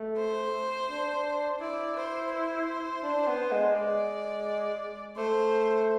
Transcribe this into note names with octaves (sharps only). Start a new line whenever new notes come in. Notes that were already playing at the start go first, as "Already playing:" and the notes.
Already playing: A3
C5
D4
E4 D5
C5
C5
D4
B3
G#3
G#3 D5
A3 C5